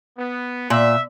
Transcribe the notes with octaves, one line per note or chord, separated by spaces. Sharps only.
B3
A#2 E5